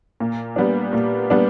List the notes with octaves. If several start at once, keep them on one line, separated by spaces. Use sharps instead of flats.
A#2
G3 B3 D4
A#2
G3 B3 D4